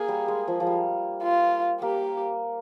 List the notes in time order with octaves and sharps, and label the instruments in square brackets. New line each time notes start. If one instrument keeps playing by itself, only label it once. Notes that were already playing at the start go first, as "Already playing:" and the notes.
Already playing: [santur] A#3 [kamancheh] G#4
[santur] G3
G#3
F3
F3
G3
[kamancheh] F4
[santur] A#3 [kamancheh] G4